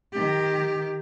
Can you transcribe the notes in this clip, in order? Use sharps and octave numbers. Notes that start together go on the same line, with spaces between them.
D#3 G4